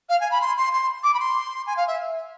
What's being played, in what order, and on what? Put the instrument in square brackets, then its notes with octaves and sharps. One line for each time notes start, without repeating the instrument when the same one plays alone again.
[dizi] F5
G#5
B5
C6
C6
C6
D6
B5
C6
G#5
F5
E5